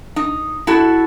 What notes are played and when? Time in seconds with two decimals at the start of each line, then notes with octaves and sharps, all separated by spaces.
0.16 D#4
0.67 E4 F#4 A4